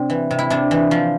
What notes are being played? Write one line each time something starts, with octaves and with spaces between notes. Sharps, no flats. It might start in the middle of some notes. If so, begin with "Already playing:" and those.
Already playing: C3 C4 D4
E3
C3
E4
C3 D4
E3
F3